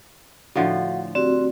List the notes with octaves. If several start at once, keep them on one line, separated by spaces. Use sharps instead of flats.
A2 D3 F3 F#4 F5 F#5
C4 F#4 G4 D5